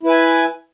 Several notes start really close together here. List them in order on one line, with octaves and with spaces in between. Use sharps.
E4 B4 G#5